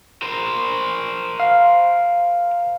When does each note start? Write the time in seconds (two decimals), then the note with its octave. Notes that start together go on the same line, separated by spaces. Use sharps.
0.23 A#4 C5
1.40 F5